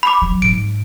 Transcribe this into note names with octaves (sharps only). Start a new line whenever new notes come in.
B5 D6
F#3
G#2 D7